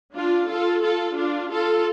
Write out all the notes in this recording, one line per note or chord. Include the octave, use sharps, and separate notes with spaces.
D4 F4
F4 A4
F4 A4
D4 F4
F4 A4